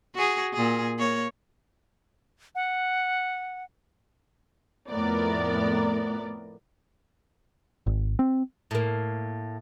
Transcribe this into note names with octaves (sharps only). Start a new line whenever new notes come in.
F#4 G#4
A#2 G#4
A#3 C#5
F#5
F2 A2 B3 A#4 D5
G#1
C4
A2 A#3